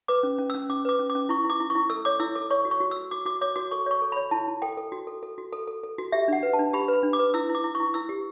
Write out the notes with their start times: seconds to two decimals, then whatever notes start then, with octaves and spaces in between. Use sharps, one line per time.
0.08 B4 D6
0.23 C#4
0.38 C#4
0.50 E6
0.55 C#4
0.70 C#4 D6
0.85 B4 D6
0.99 C#4
1.10 D6
1.15 C#4
1.29 E4 C#6
1.44 E4
1.50 D6
1.60 E4
1.70 C#6
1.75 E4
1.90 A4 E6
2.05 C#5 D6
2.20 E4 E6
2.35 A4 D6
2.51 C#5 C#6
2.65 F#4
2.71 C#6
2.80 F#4
2.91 E6
2.96 F#4
3.11 F#4 D6
3.26 F#4 D6
3.41 C#5 D6
3.56 F#4 D6
3.71 A4 C#6
3.86 C#5 C#6
4.02 A4
4.12 B5
4.16 C#5
4.31 E4 A5
4.47 E4
4.62 A4 G5
4.77 A4
4.92 F#4
5.07 A4
5.23 A4
5.38 F#4
5.53 A4
5.67 A4
5.83 A4
5.98 F#4
6.12 G4 E5
6.28 D4 F#5
6.43 B4
6.53 A5
6.59 D4
6.73 G4 B5
6.88 B4 B5
7.03 D4
7.13 D6
7.19 B4
7.34 E4 E6
7.49 E4
7.55 D6
7.64 E4
7.75 C#6
7.80 E4
7.94 E4 E6
8.09 G4